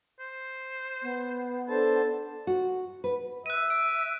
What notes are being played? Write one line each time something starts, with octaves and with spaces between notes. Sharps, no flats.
C5
B3
D4 A4 C5 A5
F#4
B4
E5 F#6 D#7
D7